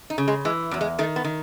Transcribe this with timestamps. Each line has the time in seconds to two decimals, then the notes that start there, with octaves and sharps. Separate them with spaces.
0.10 D#4
0.18 C#3
0.28 G#3
0.45 E3 G#3
0.71 E2 F#3
0.81 G#3
0.99 D#3 A3
1.16 B3
1.25 D#3